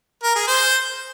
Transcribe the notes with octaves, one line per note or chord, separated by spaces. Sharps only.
A#4
G#4
C5